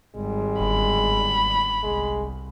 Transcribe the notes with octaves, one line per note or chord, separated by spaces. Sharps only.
G#1 G3 G#3
G1 B5
C2 G#3